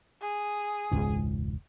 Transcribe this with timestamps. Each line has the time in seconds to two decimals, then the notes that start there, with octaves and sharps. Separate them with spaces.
0.21 G#4
0.92 E1 C#2 G#2